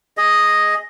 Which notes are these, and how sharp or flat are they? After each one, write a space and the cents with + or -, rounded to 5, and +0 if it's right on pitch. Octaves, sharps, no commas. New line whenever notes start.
G#4 +0 D#5 +0